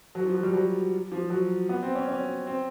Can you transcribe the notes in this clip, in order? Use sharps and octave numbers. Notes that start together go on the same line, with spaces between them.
F#3
F3
F#3
G3
F#3
F3
F#3
B3
C4
C#4
C#4
C4